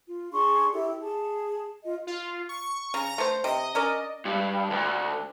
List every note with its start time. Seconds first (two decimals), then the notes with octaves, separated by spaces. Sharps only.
0.06 F4
0.32 D4 G#4 C6 C#6
0.73 E4 G4 A4
1.00 G#4 A5
1.84 F4 D#5
2.07 F4
2.49 C#6
2.94 C#3 A#5
3.18 A3 C5
3.44 C3 D#5
3.75 C#4 A#4 D5
4.25 G2
4.70 D2